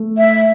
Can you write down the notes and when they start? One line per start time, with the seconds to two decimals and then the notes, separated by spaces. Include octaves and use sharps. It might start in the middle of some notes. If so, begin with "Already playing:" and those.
Already playing: A3
0.18 E5